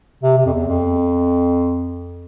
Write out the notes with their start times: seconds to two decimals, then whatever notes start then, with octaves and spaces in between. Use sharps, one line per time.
0.23 C3
0.38 C3
0.46 F2
0.53 E2
0.68 F2